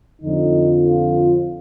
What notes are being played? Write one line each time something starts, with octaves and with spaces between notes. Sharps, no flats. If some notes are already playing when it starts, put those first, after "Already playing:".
F2 D3 F3 D#4
F4